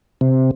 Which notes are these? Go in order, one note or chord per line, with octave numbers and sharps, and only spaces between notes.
C3